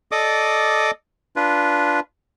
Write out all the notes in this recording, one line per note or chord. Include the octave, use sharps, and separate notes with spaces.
A4 D5 D#5 D6 D#6
D4 F4 B4